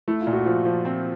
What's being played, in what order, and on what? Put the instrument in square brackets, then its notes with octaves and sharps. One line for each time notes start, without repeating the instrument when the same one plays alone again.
[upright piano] A3 [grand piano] E4
[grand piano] F4
[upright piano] A#2
[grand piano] F#4
[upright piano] F3 [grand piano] F4
[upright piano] F3
C4